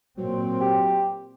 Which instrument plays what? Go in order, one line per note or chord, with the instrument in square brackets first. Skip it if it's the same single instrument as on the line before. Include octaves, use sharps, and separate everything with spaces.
[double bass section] A#2 C4 [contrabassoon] F#3
[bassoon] G4